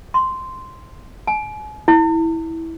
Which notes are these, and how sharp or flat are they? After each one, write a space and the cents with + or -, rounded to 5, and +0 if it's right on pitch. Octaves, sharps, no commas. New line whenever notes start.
C6 -5
G#5 +40
E4 -15